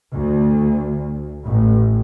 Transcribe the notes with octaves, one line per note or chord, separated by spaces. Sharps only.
D2
A1